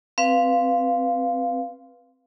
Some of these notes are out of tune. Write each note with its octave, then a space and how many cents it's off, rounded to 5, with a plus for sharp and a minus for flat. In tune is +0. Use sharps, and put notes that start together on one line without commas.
C4 -5 B4 +0 F5 +0